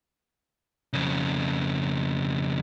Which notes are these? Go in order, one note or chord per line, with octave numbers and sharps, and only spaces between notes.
F2 C#3